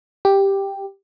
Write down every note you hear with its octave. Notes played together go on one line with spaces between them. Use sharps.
G4